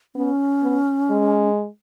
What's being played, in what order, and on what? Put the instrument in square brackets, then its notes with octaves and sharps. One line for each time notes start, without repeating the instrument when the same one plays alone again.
[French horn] B3 [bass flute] C#4
[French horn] B3
G#3